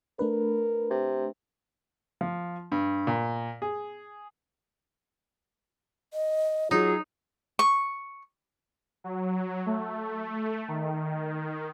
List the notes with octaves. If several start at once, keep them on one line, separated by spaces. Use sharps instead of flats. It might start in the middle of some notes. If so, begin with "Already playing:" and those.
A3 D4 A#4 B4
C3
F3
G2
A#2
G#4
D#5
F#3 D#4 F4 G#4
C#6
F#3
A3
D#3